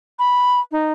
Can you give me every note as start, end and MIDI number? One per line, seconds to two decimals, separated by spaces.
0.19 0.60 83
0.72 0.93 63